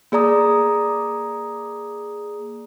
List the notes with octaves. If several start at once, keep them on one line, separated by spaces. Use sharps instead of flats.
A#3 G#4 D5 A#5 D#6